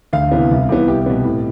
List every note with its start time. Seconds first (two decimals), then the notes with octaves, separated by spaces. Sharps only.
0.13 D2 F5
0.32 C3 E3 B3
0.51 C2
0.69 C3 E3 B3
0.88 C2 G4
1.06 B2 B3
1.24 A2